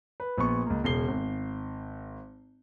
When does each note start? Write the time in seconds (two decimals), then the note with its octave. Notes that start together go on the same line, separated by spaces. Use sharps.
0.20 B4
0.38 A#1 B3 C#6
0.66 C#2 A#3
0.84 E1 C#3 C7 G7
1.08 G#1